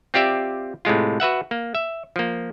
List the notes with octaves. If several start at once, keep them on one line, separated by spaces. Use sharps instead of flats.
C4 F4 G4 D5 E5
A2 C3 G#3 F4
F#4 B4 E5 F#5
A#3
E5
F3 A#3